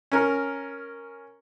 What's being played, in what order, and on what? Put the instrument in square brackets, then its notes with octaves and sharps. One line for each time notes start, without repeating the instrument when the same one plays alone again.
[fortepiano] C#4 A#4